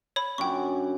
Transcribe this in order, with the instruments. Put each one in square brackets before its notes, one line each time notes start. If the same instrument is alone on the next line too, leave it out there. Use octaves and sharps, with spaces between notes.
[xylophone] C#5 B5
[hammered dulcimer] F#2 D3 [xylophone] G5 C#6